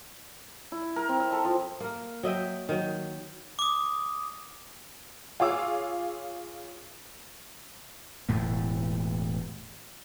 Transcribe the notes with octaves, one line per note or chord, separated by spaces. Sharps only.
E4
A#4
C4
E5
A4
F3
A#3 A#4
F#3 D#5 E5 G5
D#3 F#3
D6 D#6
F4 G#4 C#5 F5 D6 E6
E1 A2 A3